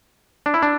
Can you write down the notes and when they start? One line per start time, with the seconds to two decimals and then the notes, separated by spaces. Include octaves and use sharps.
0.46 D4
0.54 E4
0.62 D4